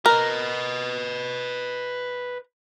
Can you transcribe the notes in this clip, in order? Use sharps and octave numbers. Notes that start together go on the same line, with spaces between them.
A#4 B4 D#5